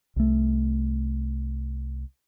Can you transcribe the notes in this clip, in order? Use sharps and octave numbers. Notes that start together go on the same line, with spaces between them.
C2 A3